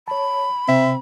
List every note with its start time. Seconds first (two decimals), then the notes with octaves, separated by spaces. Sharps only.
0.08 C#5 A5 B5
0.69 C3 C4 E5